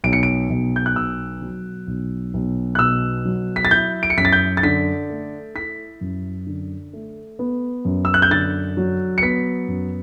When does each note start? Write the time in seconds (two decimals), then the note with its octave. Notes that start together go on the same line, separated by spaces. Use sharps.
0.04 B1 D7
0.13 C#7
0.23 D7
0.50 B1
0.76 G6
0.86 F#6
0.95 B2 E6
1.42 F#3
1.87 B1
2.34 B1
2.75 F#6
2.79 B2 E6
3.25 F#3
3.56 B6
3.65 A6
3.71 E4 G6
4.03 D7
4.10 C#7
4.17 F#2 B6
4.25 A6
4.33 G6
4.57 A6
4.63 D3 B6
5.10 A3
5.55 E4 B6
6.01 F#2
6.47 D3
6.93 A3
7.39 B3
7.85 F#2
8.05 E6
8.14 F#6
8.22 G6
8.30 D3 A6
8.77 F#3
9.18 C#7
9.22 B3 B6
9.68 F#2